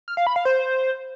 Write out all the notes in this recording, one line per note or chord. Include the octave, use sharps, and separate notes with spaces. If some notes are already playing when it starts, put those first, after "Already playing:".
F6
F5
B5
F5
C5